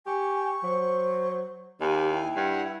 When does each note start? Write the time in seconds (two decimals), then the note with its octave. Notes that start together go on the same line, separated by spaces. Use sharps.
0.07 G4 G#5 C#6
0.63 F#3 C5
1.81 D#2 D#4 G4 G#5
2.13 E4 G5
2.36 G2 F#5